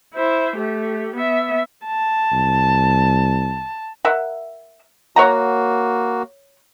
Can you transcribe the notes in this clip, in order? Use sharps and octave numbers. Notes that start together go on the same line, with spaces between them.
E4 C5
A3 G4
B3 E5
A5
C2
A#4 E5 F#5
A#3 F#4 C#5 F#5 A#5